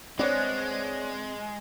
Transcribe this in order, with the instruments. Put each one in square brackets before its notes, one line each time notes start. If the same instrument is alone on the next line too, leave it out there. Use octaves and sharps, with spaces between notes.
[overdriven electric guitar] G#3 [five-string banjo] B3 D4 [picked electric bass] C4 [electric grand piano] C#5 D5